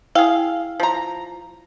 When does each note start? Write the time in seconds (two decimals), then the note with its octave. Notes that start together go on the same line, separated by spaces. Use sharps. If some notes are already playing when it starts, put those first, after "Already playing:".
0.15 E4 G#4 F5 G5
0.80 F3 A#5